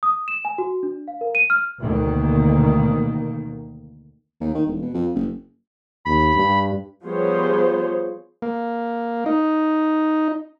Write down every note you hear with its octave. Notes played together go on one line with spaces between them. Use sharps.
D#6
E7
G#5
F#4
D4
F5
A#4
D#7
F6
D2 B2 D#3 A#3
D#2
D#3
E1
B2
F2
F#1
D#2 B5
G2
F3 G3 B3 G#4 C5 C#5
A#3
D#4